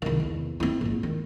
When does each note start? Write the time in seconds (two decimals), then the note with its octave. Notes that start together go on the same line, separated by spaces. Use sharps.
0.02 C2 D#3
0.20 E2
0.60 C4 E4
0.81 A#1 G#2
1.03 D#3